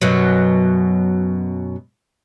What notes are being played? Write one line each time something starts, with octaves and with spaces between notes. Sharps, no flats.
F#2 B2 F#3